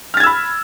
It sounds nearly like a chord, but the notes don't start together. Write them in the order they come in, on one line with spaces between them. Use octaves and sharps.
F6 A6 G#6 E6 B5